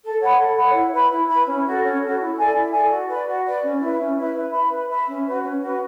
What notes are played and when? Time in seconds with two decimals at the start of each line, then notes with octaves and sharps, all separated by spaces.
0.03 A4
0.20 C#5 F#5 B5
0.38 A4
0.57 C#5 F#5 B5
0.74 E4
0.92 B4 E5 B5
1.11 E4
1.28 B4 E5 B5
1.46 C#4
1.65 F#4 A4
1.82 C#4
2.00 F#4 A4
2.19 E4
2.36 A4 D5 G#5
2.54 E4
2.72 A4 D5 G#5
2.91 F#4
3.09 B4 D5
3.26 F#4
3.45 B4 D5
3.62 C#4
3.81 E4 B4 E5
3.99 C#4
4.17 E4 B4 E5
4.34 B4
4.52 E5 B5
4.70 B4
4.89 E5 B5
5.07 C#4
5.25 F#4 B4
5.42 C#4
5.60 F#4 B4